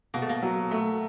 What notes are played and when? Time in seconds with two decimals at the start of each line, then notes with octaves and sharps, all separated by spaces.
0.14 B2 A#3
0.22 A3
0.29 A#3
0.43 F#3
0.71 A3